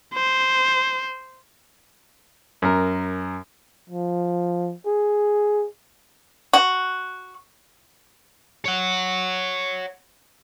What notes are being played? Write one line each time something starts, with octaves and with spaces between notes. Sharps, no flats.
C5
F#2 A#4
F3
G#4
F#4
C#5 F#5